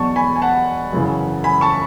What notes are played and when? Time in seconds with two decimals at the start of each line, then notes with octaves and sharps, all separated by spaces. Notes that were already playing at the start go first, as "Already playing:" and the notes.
Already playing: E2 B2 F#3 A5 C#6
0.16 G#5 B5
0.36 G#5
0.42 F#5 A5
0.93 F#2 C#3 E3
1.44 G#5 B5
1.61 A5 C#6